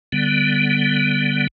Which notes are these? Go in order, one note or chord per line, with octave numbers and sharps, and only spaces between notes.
D3 G3 B3